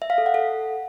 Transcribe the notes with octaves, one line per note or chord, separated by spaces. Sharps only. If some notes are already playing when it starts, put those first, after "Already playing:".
E5
F5
A4
F#5
A4